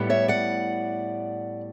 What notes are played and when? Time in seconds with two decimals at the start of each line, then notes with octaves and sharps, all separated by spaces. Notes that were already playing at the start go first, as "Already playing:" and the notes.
Already playing: A2 G3 B3
0.10 C#5 E5
0.28 D5 F#5